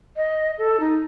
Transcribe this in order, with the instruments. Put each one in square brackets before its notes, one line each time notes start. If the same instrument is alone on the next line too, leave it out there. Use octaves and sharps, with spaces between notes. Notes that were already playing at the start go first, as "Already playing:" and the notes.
[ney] D#5
A4
D#4